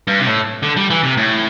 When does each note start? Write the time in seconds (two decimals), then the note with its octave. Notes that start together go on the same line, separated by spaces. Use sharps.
0.07 G2
0.20 C3
0.27 A2
0.63 D3
0.77 G3
0.90 E3
1.03 C3
1.17 A2